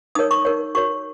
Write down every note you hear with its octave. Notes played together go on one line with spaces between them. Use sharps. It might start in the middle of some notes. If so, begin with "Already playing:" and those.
D#4 A#4 C#5 D#6
C#6
D#4 A#4 C#5
F#4 A#4 C#5 C#6